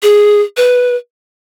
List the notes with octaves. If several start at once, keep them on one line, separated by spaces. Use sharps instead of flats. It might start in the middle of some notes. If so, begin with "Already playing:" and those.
G#4
B4